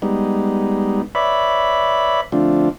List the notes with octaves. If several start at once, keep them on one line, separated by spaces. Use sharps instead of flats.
G3 G#3 B3 D#4
B4 C#5 D5 E5 B5
D3 F3 A3 C4 D4 F4